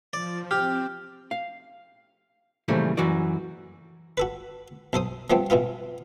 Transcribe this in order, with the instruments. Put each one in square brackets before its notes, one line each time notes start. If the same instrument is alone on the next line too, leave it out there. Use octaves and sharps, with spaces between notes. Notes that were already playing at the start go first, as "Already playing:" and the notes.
[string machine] F3 [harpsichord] D5
[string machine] C4 [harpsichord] G4 [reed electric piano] F6
[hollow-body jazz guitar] F5
A#2 C#3 E3 F3 G3 A3
F#2 E3 F#4 D5
[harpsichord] F#4 A4 B4
B1 A4 C5 D#6
F3 G3 A3 B3 C4
B2 E3 B3 F4